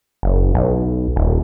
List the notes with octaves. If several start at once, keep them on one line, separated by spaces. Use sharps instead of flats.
F#1
B1
D#1